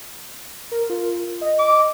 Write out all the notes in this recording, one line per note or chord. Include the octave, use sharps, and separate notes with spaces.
A#4
F4
D#5
D6